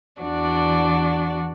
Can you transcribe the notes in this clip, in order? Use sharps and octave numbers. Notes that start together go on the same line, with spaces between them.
E2 E3 D4 F#4 D5